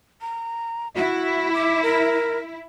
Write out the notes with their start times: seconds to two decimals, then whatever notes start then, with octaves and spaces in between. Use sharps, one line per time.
0.21 A#5
0.95 E4 F#4
1.54 D6
1.83 A#4